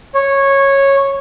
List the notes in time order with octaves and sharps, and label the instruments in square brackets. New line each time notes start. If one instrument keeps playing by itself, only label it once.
[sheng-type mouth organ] C#5